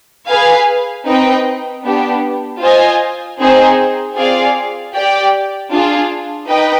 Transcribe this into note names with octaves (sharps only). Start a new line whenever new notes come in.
G#4 B4 F5 G#5
C4 D#4 B4 D#5 G5
B3 D4 G4
F4 C5 D#5 G#5
C4 D#4 G#4 C5
C4 F4 G#4 D5 F5
G4 D5 G5
D4 F4 G#4
D#4 B4 D#5 G5